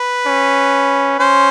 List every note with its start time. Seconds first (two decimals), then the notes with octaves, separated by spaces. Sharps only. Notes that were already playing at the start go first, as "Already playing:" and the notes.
Already playing: B4
0.26 C#4
1.20 C#4 C5